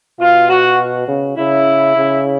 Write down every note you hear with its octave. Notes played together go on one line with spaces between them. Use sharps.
B2 F4
F#4
C#3
C#3 E4
C#3